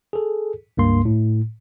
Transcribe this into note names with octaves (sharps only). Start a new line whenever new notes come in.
G#4 A4
C#2 G2 A#3 C6
A2